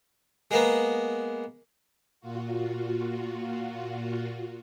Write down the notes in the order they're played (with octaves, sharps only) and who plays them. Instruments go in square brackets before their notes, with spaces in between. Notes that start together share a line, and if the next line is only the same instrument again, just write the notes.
[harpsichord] G#3 A#3 B3
[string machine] A#2 F4 F#4